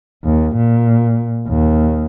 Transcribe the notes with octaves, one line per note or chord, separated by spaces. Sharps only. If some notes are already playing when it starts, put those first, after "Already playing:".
D#2
A#2
D#2